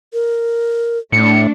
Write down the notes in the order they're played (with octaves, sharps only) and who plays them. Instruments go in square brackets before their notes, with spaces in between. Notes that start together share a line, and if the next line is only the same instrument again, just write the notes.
[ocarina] A#4
[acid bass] A2 [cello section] A3 D4 [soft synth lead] C#7